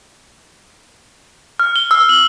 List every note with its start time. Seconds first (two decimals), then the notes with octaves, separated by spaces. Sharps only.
1.59 F6
1.76 G7
1.91 E6
2.09 F#7